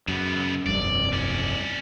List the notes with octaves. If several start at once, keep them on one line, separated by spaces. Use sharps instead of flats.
F#2 C#3 B3
F1 C2 G2 D5
C#4 D5